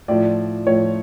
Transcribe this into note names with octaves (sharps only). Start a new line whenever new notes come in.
A2 F3 D5
A2 F3 C#5